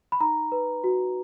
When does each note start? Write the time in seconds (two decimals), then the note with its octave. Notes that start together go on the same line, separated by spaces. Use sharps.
0.12 B5
0.20 D#4 A#5
0.52 B4
0.84 F#4